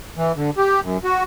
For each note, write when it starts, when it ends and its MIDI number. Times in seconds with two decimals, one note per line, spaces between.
0.17 0.32 52
0.36 0.50 50
0.58 0.80 67
0.83 0.98 42
1.04 1.23 66